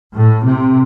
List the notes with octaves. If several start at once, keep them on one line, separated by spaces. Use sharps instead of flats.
A2
C3